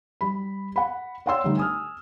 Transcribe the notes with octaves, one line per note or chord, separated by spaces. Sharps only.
G3 B5
F#5 B5
C#5 D5 F#5 G5 C6 E6
D3 G3 A3 D4 D#4
G#5 D#6 F6